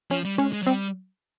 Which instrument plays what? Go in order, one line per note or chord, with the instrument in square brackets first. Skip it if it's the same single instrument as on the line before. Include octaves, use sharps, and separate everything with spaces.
[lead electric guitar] F3 [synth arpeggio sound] C#4
[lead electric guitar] G3
[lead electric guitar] G#3 [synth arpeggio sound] C#4
[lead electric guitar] G#3
F#3
[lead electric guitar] G3 [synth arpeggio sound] C4